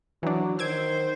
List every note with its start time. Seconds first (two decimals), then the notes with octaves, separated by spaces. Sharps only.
0.23 E3 F#3 D4
0.59 D#3 C5 E6 G#6 D7